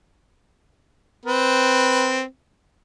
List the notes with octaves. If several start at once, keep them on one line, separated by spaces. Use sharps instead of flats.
C4 B4